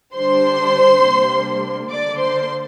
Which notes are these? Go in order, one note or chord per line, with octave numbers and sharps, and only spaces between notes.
D3 G3 D4 C5 C6
C3 G3 A#3 D4
D3 A#3 D4 D5 D6
C5 C6